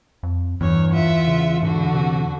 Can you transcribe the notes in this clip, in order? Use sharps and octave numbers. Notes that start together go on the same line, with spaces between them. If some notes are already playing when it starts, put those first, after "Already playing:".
F2
E2 G2 C#5
F4 E5 F#5
C#3
G#2 D3 F#4
C3